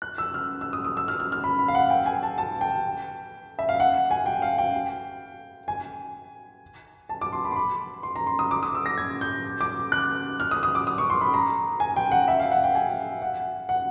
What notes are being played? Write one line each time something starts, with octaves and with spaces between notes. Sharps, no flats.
F#6
E6
F6
E6
D#6
D#6
E6
F6
F6
F6
B5
B5
F5
F#5
G5
G#5
A5
A5
G5
E5
F5
F#5
G#5
G5
F5
G5
G#5
A5
D6
C6
B5
C6
B5
C6
A#5
C6
D#6
D6
D#6
E6
A#6
G#6
G6
D6
F#6
F6
D#6
D#6
D6
D#6
C#6
C6
B5
A#5
G#5
G5
F#5
E5
F5
F#5
G5
G#5
F#5
F#5